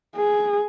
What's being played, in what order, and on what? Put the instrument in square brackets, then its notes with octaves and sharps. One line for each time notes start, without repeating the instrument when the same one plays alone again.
[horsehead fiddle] G#4